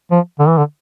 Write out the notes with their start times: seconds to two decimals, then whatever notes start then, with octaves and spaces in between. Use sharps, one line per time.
0.11 F3
0.39 D3
0.48 E3
0.58 D3